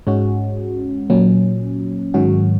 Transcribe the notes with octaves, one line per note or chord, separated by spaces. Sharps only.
G#2 G#3 C#4 F#4
A#2 F#3 C#4
G#2 D#3 F#3 C#4 F#4